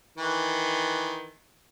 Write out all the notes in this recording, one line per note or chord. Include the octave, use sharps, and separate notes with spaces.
D#3 E3